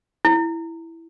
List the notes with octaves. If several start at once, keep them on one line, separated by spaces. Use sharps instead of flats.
E4